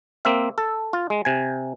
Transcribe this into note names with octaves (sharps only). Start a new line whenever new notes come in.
A#3 C4 E5
A4
F4
G#3
C3 G#5